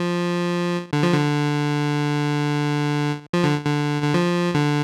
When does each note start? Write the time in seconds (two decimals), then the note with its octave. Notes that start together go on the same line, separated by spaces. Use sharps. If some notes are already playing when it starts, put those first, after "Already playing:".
Already playing: F3
0.93 D3
1.03 F3
1.13 D3
3.33 F3
3.44 D3
3.66 D3
4.02 D3
4.14 F3
4.54 D3